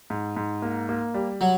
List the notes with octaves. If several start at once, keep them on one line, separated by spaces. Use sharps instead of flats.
G#2
G#2
A#3
A#3
G3
F#3